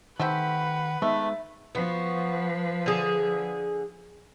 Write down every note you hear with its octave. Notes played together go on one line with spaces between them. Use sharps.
D#3 A3 C4 G4 B4 F#5
G#3 A3 B3 D#4 E5
F3 B3 F#4 B4
D3 G#4